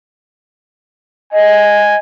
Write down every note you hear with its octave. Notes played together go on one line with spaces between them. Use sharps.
D#5 G#5